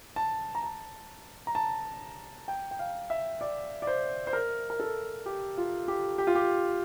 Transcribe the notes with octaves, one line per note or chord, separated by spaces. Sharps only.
A5
A#5
A5
A#5
A5
G5
G5
F5
E5
D5
D5
C5
C5
A#4
A#4
A4
G4
F4
G4
G4
F4
G4